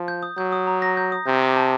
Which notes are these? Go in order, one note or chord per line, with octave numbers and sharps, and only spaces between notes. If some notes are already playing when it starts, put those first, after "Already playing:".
Already playing: F3
G6
D#6
F#3 G6
D#6
A#5
A#6
G6
D#6
C3 G6
D6
A5